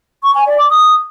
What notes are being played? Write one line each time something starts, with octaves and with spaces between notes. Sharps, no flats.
C#6
G#5
D5
D6
D#6